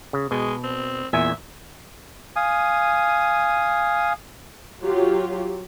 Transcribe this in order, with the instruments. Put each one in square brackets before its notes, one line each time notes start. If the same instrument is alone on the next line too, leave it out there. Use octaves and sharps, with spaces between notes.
[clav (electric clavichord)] C#3
[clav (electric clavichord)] B2 [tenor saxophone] G#3
[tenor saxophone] C4
[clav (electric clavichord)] E2 A#2 G#5 [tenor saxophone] E5
[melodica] F5 G#5 D#6
[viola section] F#3 F4 G4